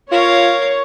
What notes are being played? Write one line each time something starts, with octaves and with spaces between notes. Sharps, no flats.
F4 A#4 C#5 F5